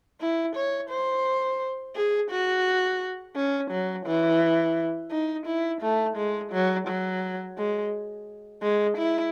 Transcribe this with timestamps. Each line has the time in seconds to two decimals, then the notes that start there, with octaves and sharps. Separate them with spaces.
0.21 E4
0.56 C#5
0.90 C5
1.95 G#4
2.30 F#4
3.35 C#4
3.71 F#3
4.06 E3
5.11 D#4
5.46 E4
5.82 A3
6.16 G#3
6.52 F#3
6.88 F#3
7.57 G#3
8.62 G#3
8.97 E4